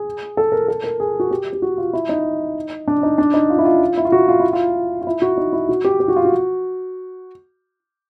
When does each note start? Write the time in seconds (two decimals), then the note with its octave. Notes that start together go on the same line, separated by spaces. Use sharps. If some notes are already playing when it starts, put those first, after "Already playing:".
Already playing: G#4
0.37 A4
0.52 A#4
0.68 A4
0.84 A#4
1.00 G#4
1.20 F#4
1.31 G4
1.53 G4
1.62 F#4
1.78 F4
1.93 E4
2.09 D#4
2.88 D4
3.03 D#4
3.18 D4
3.34 D#4
3.50 F4
3.59 E4
3.65 F4
3.97 E4
4.05 F4
4.12 F#4
4.28 F4
4.40 E4
4.53 F4
5.01 F4
5.07 E4
5.22 F#4
5.37 D#4
5.53 E4
5.69 F#4
5.84 G4
6.00 G4
6.08 F#4
6.16 F4
6.25 F#4